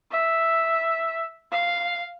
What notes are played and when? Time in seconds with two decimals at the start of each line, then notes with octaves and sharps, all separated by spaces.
0.11 E5
1.52 F5